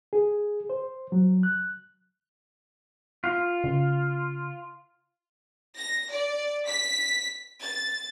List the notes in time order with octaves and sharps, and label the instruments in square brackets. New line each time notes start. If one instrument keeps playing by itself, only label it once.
[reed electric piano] G#4
C5
F#3
F#6
[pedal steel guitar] F4
[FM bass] C#3
[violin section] A#6
D5
B6
A6